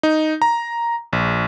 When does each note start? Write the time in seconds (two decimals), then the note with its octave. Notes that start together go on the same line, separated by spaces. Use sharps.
0.03 D#4
0.42 A#5
1.13 A#1